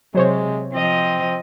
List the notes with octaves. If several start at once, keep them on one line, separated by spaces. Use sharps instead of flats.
C3 F#3 G#3 C5 C#5
F3 C4 D#5